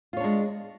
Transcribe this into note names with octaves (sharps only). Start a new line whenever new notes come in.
G#3 D4 F4 C#5